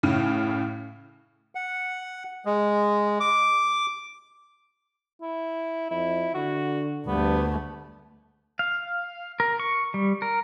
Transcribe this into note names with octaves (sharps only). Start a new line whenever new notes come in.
A2 C#3
F#5
G#3
D6
E4
F2 E4
D3 F#4
D2 G2 A3 B3
F5
A#4
C#6
G3
A#4